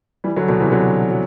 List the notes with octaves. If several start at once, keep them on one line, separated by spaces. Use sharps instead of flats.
E3 G3
D3 F#3
B2 D3
C3 E3
D3 F#3
F#3